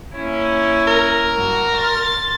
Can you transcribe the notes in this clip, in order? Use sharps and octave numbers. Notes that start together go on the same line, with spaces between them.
A#3 C#4 E4
A#4
G2 F#4
C6 A6